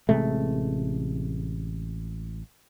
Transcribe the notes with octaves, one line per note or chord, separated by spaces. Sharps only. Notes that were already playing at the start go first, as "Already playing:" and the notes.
A1 C3 G#3 A3